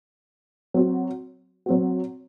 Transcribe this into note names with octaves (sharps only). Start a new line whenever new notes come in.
F#3 C4 F#4
F#3 C4 F#4